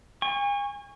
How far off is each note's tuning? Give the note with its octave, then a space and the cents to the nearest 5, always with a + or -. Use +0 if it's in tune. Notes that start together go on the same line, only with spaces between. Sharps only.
G#5 -40 C#6 +0